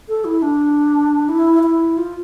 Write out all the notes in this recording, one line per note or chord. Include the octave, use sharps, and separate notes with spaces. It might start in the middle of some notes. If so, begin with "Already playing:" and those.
A4
E4
D4
E4
E4
F4